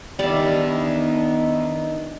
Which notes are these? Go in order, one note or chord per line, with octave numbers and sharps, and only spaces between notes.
D#3 G3 B3 D4 D#4 D5 E5